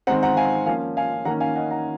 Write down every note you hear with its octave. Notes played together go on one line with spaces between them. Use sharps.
D#3 G#3 C4 F#5 A#5
F#5 A#5
F5 G#5
F3 A#3 C#4 F5 G#5
F5 G#5
D#3 A#3 C#4 F#5 A#5
F5 G#5
D#5 F#5
F#5 A#5